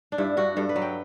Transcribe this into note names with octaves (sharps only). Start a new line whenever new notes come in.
D4
G2 E4
G2 F#4
G2 A4
B4
F#3
G5